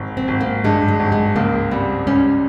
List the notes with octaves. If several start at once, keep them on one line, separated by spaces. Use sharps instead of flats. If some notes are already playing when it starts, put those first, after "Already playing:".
Already playing: G#1
C4
G#1
A#3
G2 G#3
G#3
G#1
G#3
C#2 A#3
G3 C4
G3 C#4